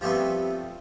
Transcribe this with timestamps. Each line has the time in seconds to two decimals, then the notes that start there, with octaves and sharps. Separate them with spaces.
0.01 F3 G3 A3 B3 C4